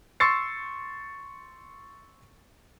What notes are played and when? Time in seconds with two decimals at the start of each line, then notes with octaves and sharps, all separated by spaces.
0.20 C6 C#6 E6 A6 C7 C#7